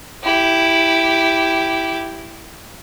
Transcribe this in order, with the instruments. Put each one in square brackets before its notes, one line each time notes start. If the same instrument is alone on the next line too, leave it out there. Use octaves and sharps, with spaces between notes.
[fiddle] E4 G4